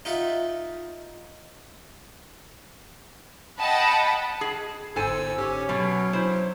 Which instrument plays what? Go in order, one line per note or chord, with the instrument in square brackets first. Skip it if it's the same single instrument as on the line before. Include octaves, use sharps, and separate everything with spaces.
[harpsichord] D#4 F4 E5 F#5
[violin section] D#5 F#5 G5 A5 B5
[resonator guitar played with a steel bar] G#4
[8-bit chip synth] G1 G#2 E6 [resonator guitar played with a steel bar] A4 C5 G#5
[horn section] C#4 [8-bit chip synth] G4
[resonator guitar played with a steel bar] B2 [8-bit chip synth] F#3
[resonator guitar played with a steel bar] E4 C5